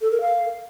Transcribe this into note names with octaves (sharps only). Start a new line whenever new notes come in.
A4
A#4
F5